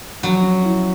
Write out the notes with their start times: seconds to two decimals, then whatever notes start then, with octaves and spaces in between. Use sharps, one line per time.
0.23 F3 F#3
0.43 C#4
0.65 E4